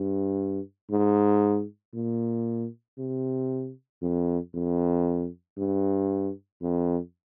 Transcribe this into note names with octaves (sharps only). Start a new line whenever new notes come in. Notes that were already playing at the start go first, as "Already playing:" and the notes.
Already playing: G2
G#2
A#2
C3
F2
F2
G2
F2